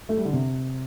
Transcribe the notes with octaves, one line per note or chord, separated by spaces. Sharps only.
A3
G3
D3
C3